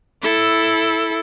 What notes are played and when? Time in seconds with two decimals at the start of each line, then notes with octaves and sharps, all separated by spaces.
0.22 E4 A4